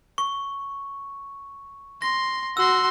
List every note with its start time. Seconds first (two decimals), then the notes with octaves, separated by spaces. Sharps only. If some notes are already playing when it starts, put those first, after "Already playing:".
0.18 C#6
2.02 C6 A#6
2.57 F#4 C6 E6